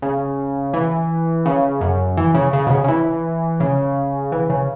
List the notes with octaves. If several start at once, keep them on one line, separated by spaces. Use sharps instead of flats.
C#3
E3
C#3
F#2
E3
C#3
C#3
B2
C#3
C#3
E3
C#3
E3
C#3